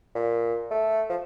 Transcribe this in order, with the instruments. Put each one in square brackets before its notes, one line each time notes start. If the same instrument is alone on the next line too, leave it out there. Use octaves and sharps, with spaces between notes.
[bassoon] A#2
A3
F3